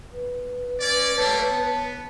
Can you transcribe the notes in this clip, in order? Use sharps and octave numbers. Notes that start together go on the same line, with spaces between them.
B4
C#4 D5
G3 A3 A#3 C#5 A5
B3